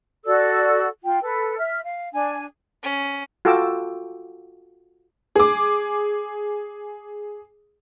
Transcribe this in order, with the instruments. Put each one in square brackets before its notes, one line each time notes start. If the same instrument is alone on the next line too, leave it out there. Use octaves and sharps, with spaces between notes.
[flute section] F#4 A4 D5 E6
F4 G5
A4 B4
E5 F6
F5
D4 G#5
[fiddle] C#4
[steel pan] F4 F#4 A4 G5 D6 E6
[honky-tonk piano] G#4 D6